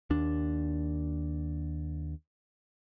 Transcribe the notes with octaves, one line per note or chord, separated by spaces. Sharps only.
D#2 D4